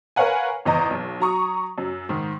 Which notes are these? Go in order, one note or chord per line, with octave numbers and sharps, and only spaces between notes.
A#4 B4 C#5 F5 F#5 G#5
G#1 E2 D#5 A#5
B1
F#3 A#5 C#6 D#6
F#2 F#3
G#2 D#3